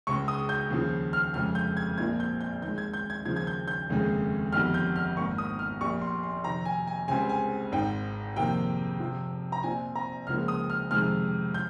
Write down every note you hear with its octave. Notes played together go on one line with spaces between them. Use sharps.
C#2 C#3 G#3 C#6
D#6
G6
D#2 C#3 F3
F6
F1 F2 C#3 G#3 F6
G6
G#6
A#1 A#2 F3 A#3 G#6
G6
G6
D#2 D#3 G#3 G6
G#6
G6
G#6
D#2 C#3 F3 G#6
G#6
G6
G6
F1 D#2 C#3 G#3
G1 F2 D#3 G3 F6
G6
F6
G#1 G#2 D#3 A#3 C#6
D#6
F6
A#1 A#2 G3 A#3 C#6
C6
C6
F2 C3 D#3 A#5
G#5
G#5
C#2 C#3 G3 C4 G#5
G#5
G#1 G#2 D#3 G5
F2 C3 D#3 A#3 G5
F2 C3 F3
A#5
A#1 A#2 F3 C4 G#5
A#5
C#2 C#3 F3 A#3 F6
D#6
F6
F2 C3 D#3 G#3 F6
G6